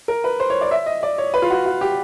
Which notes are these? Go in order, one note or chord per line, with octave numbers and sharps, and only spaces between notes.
A#4
B4
C5
C#5
D5
E5
D#5
D5
C#5
B4
F4
F#4
F#4
G4